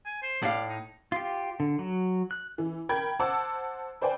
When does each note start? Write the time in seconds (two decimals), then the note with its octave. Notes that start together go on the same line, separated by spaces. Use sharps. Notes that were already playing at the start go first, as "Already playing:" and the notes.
0.05 G#5
0.22 C5
0.42 A2 D5 F5
0.68 D#4
1.12 F4 G4
1.60 D3
1.79 F#3
2.31 F#6
2.58 E3
2.89 A#4 G5 B5 G#6
3.20 C5 F#5 A5 D6 E6
4.01 B4 C5 D5 G5 G#5